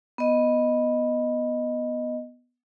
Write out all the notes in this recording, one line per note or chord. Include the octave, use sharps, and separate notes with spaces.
B3 D#5